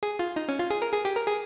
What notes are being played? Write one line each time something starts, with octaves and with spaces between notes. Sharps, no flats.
G#4
F4
D#4
C#4
F4
G#4
A#4
G#4
G4
A#4
G#4